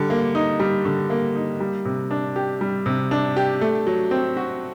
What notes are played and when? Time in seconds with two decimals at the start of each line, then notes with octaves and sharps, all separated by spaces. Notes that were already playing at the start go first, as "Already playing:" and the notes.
Already playing: D3 G3
0.10 A#3
0.35 D#4
0.60 G3
0.85 D3
1.10 A#3
1.35 D#4
1.60 G3
1.85 C3
2.11 D4
2.36 G4
2.61 G3
2.86 C3
3.11 D4
3.36 G4
3.61 A3
3.87 F#3
4.11 C4
4.37 F#4